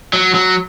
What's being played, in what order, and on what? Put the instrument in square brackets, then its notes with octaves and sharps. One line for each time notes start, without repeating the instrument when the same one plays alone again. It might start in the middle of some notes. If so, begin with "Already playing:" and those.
[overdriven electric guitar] F#3
F#3